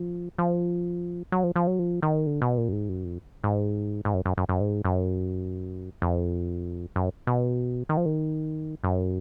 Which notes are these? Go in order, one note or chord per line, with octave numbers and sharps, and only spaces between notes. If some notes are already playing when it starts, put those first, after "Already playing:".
Already playing: F3
F3
F#3
F3
F3
F#3
F3
D#3
D3
B2
A#2
F#2
G#2
F#2
F2
G#2
G#2
F#2
F#2
F#2
F#2
G#2
F#2
F2
F#2
B2
D#3
F3
D#3
F#2